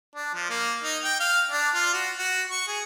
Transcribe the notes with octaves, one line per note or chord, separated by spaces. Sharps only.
D4
F3
A#3
D#4
G5
F5
D4
F4
F#4
F#4
C#6
G#4